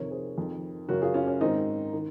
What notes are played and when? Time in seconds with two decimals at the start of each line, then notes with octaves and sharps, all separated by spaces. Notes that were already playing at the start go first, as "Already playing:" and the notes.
Already playing: F2 C3 D#3 A#4 C#5
0.11 G#4 C5
0.38 F2 D#3
0.88 F#2 C#3 F#4 A#4
1.02 F4 G#4
1.14 C#4 F4
1.27 C#4
1.41 G#2 D#3 C4 D#4
1.93 D#3